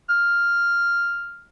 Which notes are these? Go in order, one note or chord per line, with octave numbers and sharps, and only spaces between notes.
F6